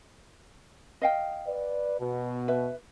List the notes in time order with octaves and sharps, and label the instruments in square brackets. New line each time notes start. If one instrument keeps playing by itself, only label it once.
[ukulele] D#5 F5 G5
[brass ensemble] B4 D5
B2
[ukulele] B4 E5